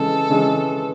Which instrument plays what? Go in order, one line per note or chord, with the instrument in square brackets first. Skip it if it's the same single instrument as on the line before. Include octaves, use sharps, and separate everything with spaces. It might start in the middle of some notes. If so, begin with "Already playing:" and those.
Already playing: [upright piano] C#3 E3 G#3 C#4 [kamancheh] A4
[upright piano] C#3 E3 G#3 C#4